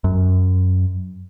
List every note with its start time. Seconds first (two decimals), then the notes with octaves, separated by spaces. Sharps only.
0.04 F#2